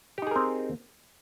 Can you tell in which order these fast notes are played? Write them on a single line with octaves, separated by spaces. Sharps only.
G4 D#4 G#4 A#4 C4